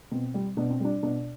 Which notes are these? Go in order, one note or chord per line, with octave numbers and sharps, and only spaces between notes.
B2 C4
G3
B2 D4
C4
G3 D4
B2 D4